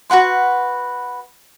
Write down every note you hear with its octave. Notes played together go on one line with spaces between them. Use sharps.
F#4 B4 F#5 C6